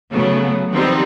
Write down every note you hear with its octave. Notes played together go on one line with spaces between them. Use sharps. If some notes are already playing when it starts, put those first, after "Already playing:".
C#3 F#3 A3 B3
D#3 F3 G3 B3 C4 D#4